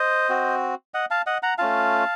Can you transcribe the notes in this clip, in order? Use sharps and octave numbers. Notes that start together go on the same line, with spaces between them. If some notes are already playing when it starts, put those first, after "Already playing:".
Already playing: C5 D#5
C4 F#4
D#5 F#5
F5 A5
D#5 F#5
F#5 A#5
A3 C#4 F4 F5 A5